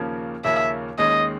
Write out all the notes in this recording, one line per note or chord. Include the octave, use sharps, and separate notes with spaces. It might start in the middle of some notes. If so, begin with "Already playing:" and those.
Already playing: D#2 C#3 F3 A#3 C#4
D#2 C#3 F3 A#3 C#4 E5
D#2 D#3 G#3 C#4 D#5